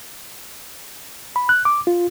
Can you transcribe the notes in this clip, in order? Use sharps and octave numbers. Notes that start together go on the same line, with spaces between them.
B5
F#6
D6
F4